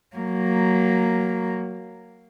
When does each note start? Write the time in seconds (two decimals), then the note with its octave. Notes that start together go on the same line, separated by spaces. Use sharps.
0.16 F#3 A#3